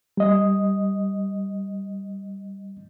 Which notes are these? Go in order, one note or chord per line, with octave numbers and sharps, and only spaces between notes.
G3 D#5